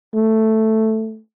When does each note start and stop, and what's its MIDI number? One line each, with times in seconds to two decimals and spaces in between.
0.15 1.20 57